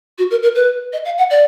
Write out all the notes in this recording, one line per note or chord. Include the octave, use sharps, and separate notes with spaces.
F#4
A#4
A#4
B4
D#5
F5
F#5
D5